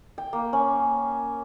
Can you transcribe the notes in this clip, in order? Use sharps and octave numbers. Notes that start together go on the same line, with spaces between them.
G5
A#3
C#4